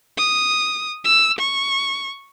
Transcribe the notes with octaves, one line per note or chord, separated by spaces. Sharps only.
D#6
E6
C#6